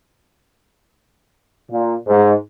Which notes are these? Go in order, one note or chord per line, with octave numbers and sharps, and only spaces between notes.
A#2
G#2